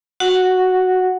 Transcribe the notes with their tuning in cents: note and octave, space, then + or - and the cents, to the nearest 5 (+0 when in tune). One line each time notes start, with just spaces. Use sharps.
F#4 +0 F#5 +0